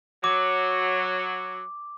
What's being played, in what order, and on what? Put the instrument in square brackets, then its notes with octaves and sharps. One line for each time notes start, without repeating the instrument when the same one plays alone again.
[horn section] F#3 [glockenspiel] D6